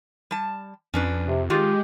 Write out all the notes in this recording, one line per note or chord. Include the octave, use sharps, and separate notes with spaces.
G3 A5
F2 C#4 D4 B4
C3
D#3 G#3 F4 G4